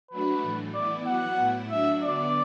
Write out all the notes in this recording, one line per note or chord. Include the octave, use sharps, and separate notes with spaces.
F#3 A3 D4 F#4 B4
A2 E3 A3
E3 B3 E4 D5
F#3 B3 F#4 F#5
A2 A3 E4
F#3 D4 F#4 E5
D3 F#3 B3 D5